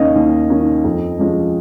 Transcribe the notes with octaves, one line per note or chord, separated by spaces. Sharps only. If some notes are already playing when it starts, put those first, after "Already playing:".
Already playing: D#2 D#3 C#4 D#5 F5
D#2
D#3 C#4
F2
F3 G#3 C#4